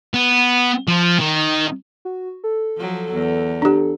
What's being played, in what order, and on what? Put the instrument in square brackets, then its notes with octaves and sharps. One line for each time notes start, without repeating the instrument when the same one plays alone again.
[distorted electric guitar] B3
F3
D#3
[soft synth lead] F#4
A4
[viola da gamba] F3 F#3
E2
[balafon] D4 G4